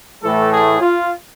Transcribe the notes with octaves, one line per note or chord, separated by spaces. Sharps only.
A2 E3 A3 A4
G#4
F4